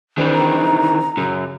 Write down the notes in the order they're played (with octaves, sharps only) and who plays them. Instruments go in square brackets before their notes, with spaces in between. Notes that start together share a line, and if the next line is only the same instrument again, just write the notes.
[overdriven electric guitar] D#3 E3 [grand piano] C4 D4 G#4
[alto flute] A#5
[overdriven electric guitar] F#2 [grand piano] C#3